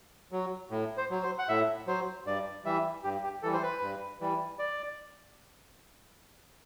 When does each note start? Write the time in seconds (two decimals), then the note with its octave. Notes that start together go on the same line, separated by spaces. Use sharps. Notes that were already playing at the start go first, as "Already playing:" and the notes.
0.32 F#3
0.71 A2
0.97 C5
1.10 F#3
1.23 C5
1.39 F#5
1.49 A2 E5
1.87 F#3 C5
2.26 G2 D5
2.65 E3 G3 E5
3.03 G2 G4
3.23 G4
3.43 E3 G3 A4
3.53 C5
3.62 B4
3.81 G2
4.21 E3 G3
4.59 D5